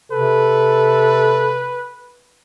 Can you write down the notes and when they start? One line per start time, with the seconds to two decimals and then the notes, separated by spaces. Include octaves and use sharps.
0.12 C3 A4 B4